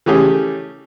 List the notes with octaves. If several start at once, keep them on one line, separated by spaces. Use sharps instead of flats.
E3 A3 C#4 G4 G#4